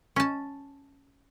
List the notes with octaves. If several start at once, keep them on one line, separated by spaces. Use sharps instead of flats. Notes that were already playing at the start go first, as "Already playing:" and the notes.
C#4 A5